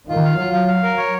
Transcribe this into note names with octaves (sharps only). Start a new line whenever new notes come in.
D#3 F4
F5
F#3 F4
F5
F5
A#4
C#5